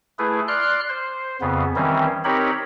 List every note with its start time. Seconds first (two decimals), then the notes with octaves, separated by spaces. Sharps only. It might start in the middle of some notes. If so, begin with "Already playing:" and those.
0.19 A3 E4 G#4 B4
0.48 D5 C6 F6 F#6
0.89 C5
1.41 F2 C#3 B3
1.76 D#3 E3 G3 C4 C#4
2.24 C4 D#4 G4 A#4 C#5 B5